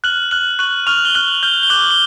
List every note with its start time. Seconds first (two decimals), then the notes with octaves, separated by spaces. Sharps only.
0.04 F6 F#6 F#7
0.31 F6 F#6 F#7
0.59 C#6 F#6 F#7
0.87 C#6 F6 F7
1.05 G7
1.15 F6 F#6 F#7
1.43 F6 G6 G7
1.63 G7
1.70 D6 F#6 F#7
1.91 G7